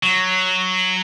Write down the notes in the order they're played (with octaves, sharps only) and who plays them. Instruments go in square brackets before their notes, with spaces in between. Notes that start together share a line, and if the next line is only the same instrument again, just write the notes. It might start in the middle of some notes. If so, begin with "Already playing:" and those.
[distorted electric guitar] F#3